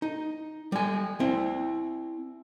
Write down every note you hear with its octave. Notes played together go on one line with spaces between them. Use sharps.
D#4
G3 G#5
C4 E4